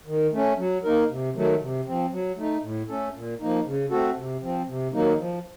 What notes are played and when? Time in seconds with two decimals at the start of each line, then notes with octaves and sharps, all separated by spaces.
0.07 D#3
0.32 A3 C#4
0.58 F#3
0.84 A#3 D#4 A#4
1.09 C3
1.35 D#3 F#3 A3
1.61 C3
1.86 F3 C4
2.12 F#3
2.37 A3 D#4
2.62 A2
2.88 A3 C#4 A4
3.14 A#2
3.40 F3 A#3 D#4
3.65 C#3
3.90 A3 C4 F#4 A4
4.17 C3
4.42 F3 C4
4.68 C3
4.93 D#3 F#3 A#3 D#4
5.19 F3